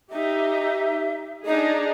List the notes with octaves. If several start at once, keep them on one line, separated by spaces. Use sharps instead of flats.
D#4 G4 E5
D4 D#4 G#4 D#5